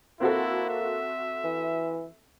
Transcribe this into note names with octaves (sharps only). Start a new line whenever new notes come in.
A#3 C4 E4 F#4 A4
E5
E3